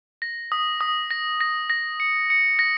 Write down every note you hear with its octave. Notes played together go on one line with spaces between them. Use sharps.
A#6
D#6
D#6
A#6
A#6
A#6
C#7
C#7
A#6